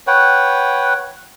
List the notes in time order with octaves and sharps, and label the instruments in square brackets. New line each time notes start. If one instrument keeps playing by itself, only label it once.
[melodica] B4 C#5 F#5 G5